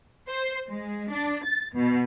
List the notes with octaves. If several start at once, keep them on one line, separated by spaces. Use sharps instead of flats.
C5
G#3
D4
A6
B2